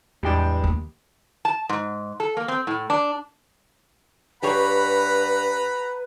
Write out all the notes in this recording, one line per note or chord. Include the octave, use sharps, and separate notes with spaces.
E2 A2 G3 G#3 D4 E4 G5
D#2
A5
G#2
A4
A#3
C4
A2
D4
G2 G4 G#4 B4 C#5 F#5 A#5 B5